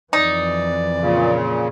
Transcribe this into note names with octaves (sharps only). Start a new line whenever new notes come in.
F2 E3 D#4 D5
A#2 C#3